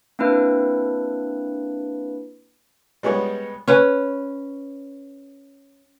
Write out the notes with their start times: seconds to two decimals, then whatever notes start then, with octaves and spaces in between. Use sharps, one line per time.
0.19 A#3 C4 D4 E4 B4
3.03 G3 G#3 B3 C#5
3.68 C#4 B4